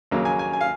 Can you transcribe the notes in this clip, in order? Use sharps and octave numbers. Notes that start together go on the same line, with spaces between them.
D#2 C#3 F#3 A#3
G#5
G#5
G#5
F5